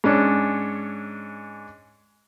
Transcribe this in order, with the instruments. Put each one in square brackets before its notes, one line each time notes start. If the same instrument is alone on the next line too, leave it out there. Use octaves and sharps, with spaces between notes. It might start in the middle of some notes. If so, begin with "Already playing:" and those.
[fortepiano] G#2 C#4 D4